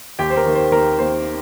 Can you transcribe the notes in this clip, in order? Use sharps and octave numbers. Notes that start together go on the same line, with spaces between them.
D#2 G4 G5
C5
A#4
D#3 A#3
C5
D#2 A#4
D#3 A#3 C5